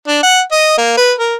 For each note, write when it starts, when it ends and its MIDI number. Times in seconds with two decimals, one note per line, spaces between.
0.07 0.22 62
0.23 0.41 78
0.52 0.74 75
0.78 0.97 58
0.97 1.13 71
1.19 1.36 70